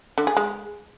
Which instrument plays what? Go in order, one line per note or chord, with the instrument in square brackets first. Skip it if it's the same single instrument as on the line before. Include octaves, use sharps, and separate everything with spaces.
[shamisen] D3
G#4
G#3